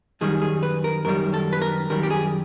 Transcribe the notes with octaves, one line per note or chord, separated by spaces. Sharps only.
F#2 D#3 G3 G#4
G#4
B4
A#4
F#2 D#3 G3 A#4
A4
B4
A#4
F#2 D#3 G3 A#4
G4
G#4